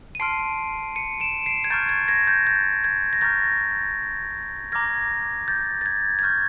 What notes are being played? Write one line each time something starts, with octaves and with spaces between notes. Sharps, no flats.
D#7
A5 C6 F6 C7 D7
C#7 D#7
D7 E7
C7 D7
G#6
A#5 C#6 F6 G6 A6
G#6
G#6 A#6
G6 A6
G6
G#6
A#6
A#5 C#6 F6 G6 A6
A#5 D6 F6 G#6 A#6
G6 A6
A6
G#6
G#6
C#6 F6 G6